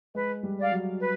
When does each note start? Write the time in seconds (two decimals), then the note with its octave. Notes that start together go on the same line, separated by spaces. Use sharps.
0.15 G#3 B4
0.43 G3
0.57 D5 F5
0.72 F#3
0.99 B4